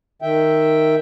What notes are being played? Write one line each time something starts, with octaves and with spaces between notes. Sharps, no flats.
D#3 E5 G5